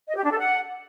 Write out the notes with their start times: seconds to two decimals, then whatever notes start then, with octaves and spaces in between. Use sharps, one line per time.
0.09 D#5
0.16 G4
0.24 D4
0.31 A4
0.39 F#5